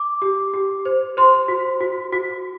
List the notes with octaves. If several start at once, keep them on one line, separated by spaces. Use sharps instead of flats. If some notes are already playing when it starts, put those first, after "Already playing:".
Already playing: D6
G4
G4
C5
C5 C6
F#4
F#4
F#4